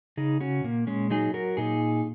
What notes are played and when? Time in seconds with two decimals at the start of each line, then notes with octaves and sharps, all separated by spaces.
0.17 C#3 D#4 G#4
0.41 C#4 F#4
0.64 A#2 A#3
0.87 G#3 C#4
1.10 F#3 D#4 G#4
1.34 F#4 A#4
1.57 A#2 D#4 G#4